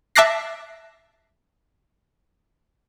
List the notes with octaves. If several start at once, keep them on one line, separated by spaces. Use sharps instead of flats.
E5 A5 D6 F#6 A#6 C7